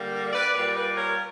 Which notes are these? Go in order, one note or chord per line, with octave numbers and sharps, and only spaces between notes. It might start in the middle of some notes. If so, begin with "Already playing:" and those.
Already playing: D3 G3 A#3
B4 D5
A#2 G3 A#3 B4 D5
B4 D5
A#4 C#5